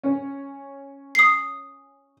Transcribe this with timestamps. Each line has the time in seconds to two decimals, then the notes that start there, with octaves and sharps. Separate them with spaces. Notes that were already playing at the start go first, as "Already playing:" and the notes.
0.04 C#4
1.15 D#6 C7